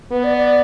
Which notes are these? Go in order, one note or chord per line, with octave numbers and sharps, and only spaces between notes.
B3 B4
D5
D5